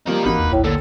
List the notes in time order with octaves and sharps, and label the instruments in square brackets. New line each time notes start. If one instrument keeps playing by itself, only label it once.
[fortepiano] F3 G3 A#3 [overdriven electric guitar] D#4 A#4
[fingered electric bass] G#1 E3 [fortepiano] A#3 D#4 F#4 [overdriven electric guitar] B4
[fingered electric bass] D#1 E2
[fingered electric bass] A1 D#2 [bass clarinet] A2
[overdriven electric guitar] A#2 [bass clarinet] D3 [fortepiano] A4